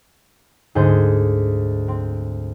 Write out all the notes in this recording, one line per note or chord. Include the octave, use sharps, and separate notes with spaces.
D2 G#2 G#4 C5 G6
C4